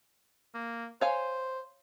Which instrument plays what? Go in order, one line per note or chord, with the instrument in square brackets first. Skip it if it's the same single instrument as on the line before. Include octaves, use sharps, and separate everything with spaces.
[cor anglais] A#3
[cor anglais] C5 [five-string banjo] C#5 F5 G#5